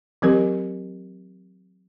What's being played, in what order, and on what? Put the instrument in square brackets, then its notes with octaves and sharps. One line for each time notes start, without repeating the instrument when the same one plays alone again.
[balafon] E3 F#3 C4 G4 A#4